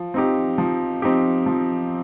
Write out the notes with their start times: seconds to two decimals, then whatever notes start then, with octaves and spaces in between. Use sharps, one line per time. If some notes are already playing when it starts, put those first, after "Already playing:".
Already playing: F3
0.14 C4 D#4 G4
0.58 F3
1.02 C4 D#4 G4
1.46 F3